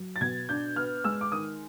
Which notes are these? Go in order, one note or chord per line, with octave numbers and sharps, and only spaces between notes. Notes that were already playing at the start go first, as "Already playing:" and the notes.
Already playing: F#3
A6
B2 G#6
D4 G6
B3 F6
G#3 E6
D6
D#3 D#6